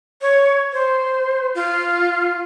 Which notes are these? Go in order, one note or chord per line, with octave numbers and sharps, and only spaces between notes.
C#5
C5
F4